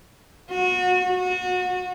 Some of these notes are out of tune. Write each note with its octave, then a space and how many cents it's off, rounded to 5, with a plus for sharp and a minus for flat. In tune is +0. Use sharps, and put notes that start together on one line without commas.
F#4 -30
F#4 -30